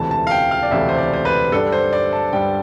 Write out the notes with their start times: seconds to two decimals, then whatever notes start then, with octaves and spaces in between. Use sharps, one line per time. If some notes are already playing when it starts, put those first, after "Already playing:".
Already playing: E1 D2 C3 E3 A3 A5
0.11 A5
0.27 F5
0.31 G5
0.51 F5
0.63 D5
0.71 E1 D2 C3 E3 A3 E5
0.89 C5
0.98 D5
1.13 C5
1.25 B4
1.52 G2 D3 G3 D4 A4
1.72 C5
1.93 D5
2.13 A5
2.33 G2 D3 G3 D4 G5